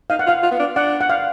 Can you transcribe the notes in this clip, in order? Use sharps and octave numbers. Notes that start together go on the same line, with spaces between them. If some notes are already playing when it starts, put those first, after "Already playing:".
D#4 F5
F#5
F4 F5
F4
B3
D4
D4 F#5
F#5
F5